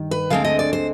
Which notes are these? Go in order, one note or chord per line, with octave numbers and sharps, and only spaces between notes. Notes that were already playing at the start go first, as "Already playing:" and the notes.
Already playing: G2 D#3
B4
D2 D3 G#3 C4 F5
D#5
D5
C5